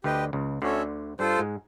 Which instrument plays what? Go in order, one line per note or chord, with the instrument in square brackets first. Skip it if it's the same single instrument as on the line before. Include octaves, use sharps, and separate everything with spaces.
[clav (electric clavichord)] D2 D3 [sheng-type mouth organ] G4 B4 D#5 G5
[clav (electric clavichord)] C#2 C#3
[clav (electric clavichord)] D2 D3 [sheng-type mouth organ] C#4 F#4 A4 C#5 E5
[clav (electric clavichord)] G2 G3 [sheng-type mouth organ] F4 A4 C5
[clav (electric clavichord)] G#2 G#3